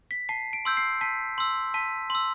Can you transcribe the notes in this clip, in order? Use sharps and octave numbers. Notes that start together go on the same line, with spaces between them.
B6
A5 C7
D7
C6 E6 G6
C7
A5 B6
C6 E6
A5 B6
C6 E6